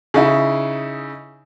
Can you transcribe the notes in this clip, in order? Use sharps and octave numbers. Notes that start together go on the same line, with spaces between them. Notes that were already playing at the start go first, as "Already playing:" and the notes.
C#3 D#4 E4